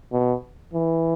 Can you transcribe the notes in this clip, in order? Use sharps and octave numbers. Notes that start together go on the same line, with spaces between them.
B2
E3